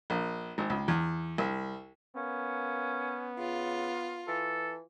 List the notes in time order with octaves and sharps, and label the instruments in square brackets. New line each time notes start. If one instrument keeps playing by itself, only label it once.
[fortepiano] A#1
G#1
C#2
E2
C2
[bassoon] A#3 [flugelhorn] B3 [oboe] C#4
[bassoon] C#3 [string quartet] F4
[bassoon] E3 [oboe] A4